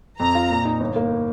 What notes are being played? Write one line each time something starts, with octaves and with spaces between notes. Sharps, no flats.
F2 A#5
F4
A#2
D#4
G1
A#3